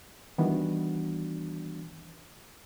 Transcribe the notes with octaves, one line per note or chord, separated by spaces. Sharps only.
D#3 E3 G3 B3 D4 F#4